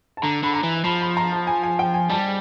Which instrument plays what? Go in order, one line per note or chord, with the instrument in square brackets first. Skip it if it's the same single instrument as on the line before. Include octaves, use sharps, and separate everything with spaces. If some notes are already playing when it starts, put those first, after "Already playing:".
[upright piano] A5
[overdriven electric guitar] D3 [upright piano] A#5
[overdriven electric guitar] D3 [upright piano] B5
[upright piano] A#5
[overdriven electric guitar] E3
[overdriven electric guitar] F3 [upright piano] B5
[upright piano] B5
A#5
A5
G#5
G#5
G5
G#5
[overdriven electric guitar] G3 [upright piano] A5